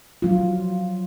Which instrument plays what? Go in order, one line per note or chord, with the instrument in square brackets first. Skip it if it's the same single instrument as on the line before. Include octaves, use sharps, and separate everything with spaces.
[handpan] F#3 F4